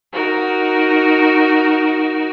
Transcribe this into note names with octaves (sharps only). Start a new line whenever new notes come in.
D#4 F#4 A#4